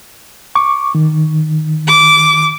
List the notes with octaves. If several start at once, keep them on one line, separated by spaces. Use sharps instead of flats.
C#6 D6
D#3
D6